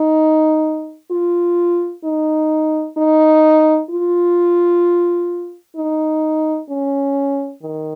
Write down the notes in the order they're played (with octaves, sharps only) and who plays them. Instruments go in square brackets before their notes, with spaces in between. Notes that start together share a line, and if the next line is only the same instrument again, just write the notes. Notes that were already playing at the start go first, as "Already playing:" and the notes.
Already playing: [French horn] D#4
F4
D#4
D#4
F4
D#4
C#4
D#3